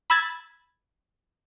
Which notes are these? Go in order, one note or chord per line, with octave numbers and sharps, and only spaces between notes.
B5 E6 G#6 A6